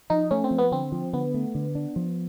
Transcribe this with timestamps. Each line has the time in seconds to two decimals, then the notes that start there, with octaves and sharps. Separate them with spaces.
0.10 F3 D#4
0.31 A3 C#4
0.44 C4
0.51 F3
0.58 B3
0.72 D3 C4
0.92 F3
1.13 D3 B3
1.34 A3
1.55 D3
1.75 D4
1.96 F3